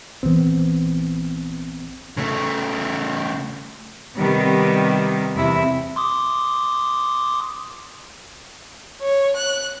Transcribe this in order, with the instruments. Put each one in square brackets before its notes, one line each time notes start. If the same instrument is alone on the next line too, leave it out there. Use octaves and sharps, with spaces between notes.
[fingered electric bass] A#1 E3 [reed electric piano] B3 C4
[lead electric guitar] C#3 A3
[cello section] C3 D#3 G3 B3
E2 C3 E4
[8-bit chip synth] C6 D6 D#6
[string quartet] C#5
F#6